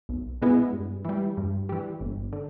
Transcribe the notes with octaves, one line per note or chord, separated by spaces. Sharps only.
B1
B2 G#3 B3 E4
G2
E3 G3
G2
E3 G3
G1
D3